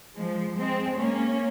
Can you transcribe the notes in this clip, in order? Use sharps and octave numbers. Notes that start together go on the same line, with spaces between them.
F3 G#3
G#3 C4
A#3 C#4